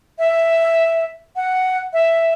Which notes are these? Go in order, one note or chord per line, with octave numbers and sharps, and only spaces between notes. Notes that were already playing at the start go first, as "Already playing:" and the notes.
E5
F#5
E5